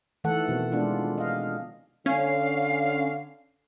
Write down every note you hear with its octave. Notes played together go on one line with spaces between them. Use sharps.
D#3 E3 A3 A4 F#5
B2 F3 C4
G#3 B3 D4 F4
D#5 F5
D3 C#4 F5